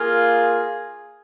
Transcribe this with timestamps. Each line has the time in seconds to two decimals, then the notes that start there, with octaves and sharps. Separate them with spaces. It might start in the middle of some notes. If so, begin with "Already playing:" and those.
Already playing: A#3 F4 G#4